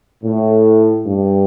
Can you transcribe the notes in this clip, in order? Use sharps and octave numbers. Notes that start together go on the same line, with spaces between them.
A2
G2